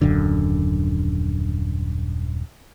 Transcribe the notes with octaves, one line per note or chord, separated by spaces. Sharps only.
D#1 F#2 D3